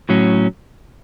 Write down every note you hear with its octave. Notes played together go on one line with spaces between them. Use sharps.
A2 F#3 C#4